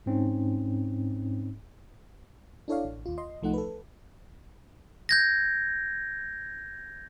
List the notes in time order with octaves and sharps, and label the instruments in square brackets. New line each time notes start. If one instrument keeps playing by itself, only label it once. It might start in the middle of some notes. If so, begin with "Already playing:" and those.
[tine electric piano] G#2 C4 C#4 D#4
[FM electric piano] D4 E4 A4 C#5 D5 F5
A1
D#2 F4
D#5 C6
C2 F3 A3 D#4 F#5
A4 B4
[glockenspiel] G6 G#6 A#6